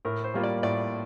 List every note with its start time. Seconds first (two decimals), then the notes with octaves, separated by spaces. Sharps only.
0.05 A2 A#4
0.24 C5
0.34 G3 A#3 F4
0.43 D5
0.63 A2 D5